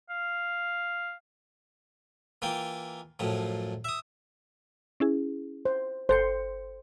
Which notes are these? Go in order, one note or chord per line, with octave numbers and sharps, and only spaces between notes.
F5
E3 A#3 F4 G5
F#2 A2 F3
E5 D#6
C#4 E4 G#4
C5
G1 A4 C5 C#7